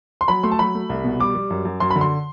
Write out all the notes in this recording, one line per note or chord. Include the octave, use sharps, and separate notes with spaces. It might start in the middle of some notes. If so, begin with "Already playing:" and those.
C6
F#3 B5
A3 C6
A5
F#3 B5
A3
C2
B2
G3 D6
G3
F#2
F#2
F#2 C6
B5
D3
C6